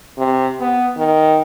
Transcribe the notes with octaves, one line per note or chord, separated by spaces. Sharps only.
C3
B3
D#3